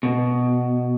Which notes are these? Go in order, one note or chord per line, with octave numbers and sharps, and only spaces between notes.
B2